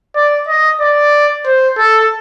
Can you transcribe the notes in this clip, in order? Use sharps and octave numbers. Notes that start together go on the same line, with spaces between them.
D5
D#5
D5
C5
A4